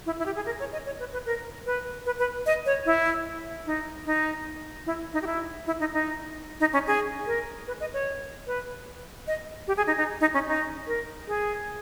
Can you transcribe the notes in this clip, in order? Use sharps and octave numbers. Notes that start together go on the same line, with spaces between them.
E4
E4
G4
G#4
A#4
C#5
D#5
C#5
B4
B4
A#4
B4
B4
B4
D#5
C#5
E4
D#4
D#4
E4
D#4
G4
E4
E4
D#4
D#4
D#4
C#4
G#4
A#4
B4
D#5
C#5
B4
D#5
G4
G#4
D#4
D#4
D#4
C#4
D#4
A#4
G#4